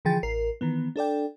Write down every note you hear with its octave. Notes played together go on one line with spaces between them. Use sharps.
D3 E3 F3 G#4 G5 A6
A1 A#4 C7
D#3 E3 B3
D4 A4 D5 G5